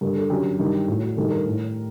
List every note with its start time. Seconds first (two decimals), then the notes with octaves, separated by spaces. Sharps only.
0.01 G2 D3 A#4
0.16 A4
0.30 F#2 D3 G4
0.59 G2 D#3
0.88 A2 F#4
1.03 F#4
1.17 G2 D#3 A4
1.31 A#4
1.46 A2